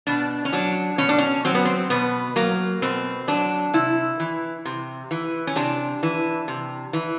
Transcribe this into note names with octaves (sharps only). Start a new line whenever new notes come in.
B2 D4
C#4
F#3 D4
B2 C#4
D4
C#4
F#3 C4
B3
C4
B2 B3
F#3 A#3
B2 C4
F#3 D4
C3 E4
E3
C3
E3
C#4
C3 D4
E3
C3
E3